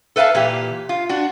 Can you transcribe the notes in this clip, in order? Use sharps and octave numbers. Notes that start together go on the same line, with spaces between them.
A4 B4 E5 F5 A5
A#2 E3 G4
F4
D4 F#4